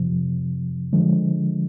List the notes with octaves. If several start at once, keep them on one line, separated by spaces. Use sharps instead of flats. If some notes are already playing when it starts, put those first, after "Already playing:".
Already playing: F2 C3 F3
D3 F3 G#3